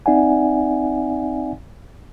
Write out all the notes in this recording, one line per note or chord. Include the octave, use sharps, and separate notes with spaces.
C4 D#4 D5 E5 F#5 G#5